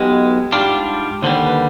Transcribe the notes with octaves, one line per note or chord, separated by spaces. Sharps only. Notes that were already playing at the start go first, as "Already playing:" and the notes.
Already playing: B1 B2 G#3 G4
G#2 G3 D4 F4 G4
D#2 D3 G3 C5
B4